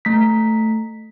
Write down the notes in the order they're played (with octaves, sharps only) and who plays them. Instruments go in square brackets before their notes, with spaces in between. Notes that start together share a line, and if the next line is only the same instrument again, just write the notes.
[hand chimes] A3 B6